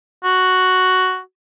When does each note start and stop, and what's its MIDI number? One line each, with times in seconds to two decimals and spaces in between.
0.24 1.20 66